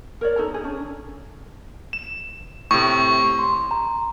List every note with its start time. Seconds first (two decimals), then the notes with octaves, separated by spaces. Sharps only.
0.21 A#4 C#5 D5
0.36 D#4 A4 A#5
0.51 D#4 G#4
0.64 C#4 D4
1.93 E7
2.71 A2 C3 C#6
3.39 C6
3.71 A#5